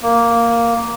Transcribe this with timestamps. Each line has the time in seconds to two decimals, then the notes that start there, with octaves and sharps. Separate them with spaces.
0.03 A#3